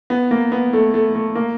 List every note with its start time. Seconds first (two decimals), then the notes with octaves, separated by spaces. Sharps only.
0.10 B3
0.31 A#3
0.52 B3
0.73 A3
0.94 A3
1.15 A3
1.35 A#3